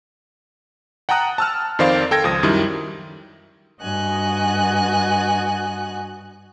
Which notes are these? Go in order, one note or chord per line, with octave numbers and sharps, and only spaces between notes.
F#5 G5 A5 A#5 D#6 F#6
A5 E6 F6
F2 D#3 C5 D5 F5
A4 G5 G#6 A#6
C#2 F3 D#6 A#6
F#2 D#3 G3 E4
G2 F#4 D#5 G#5 F#6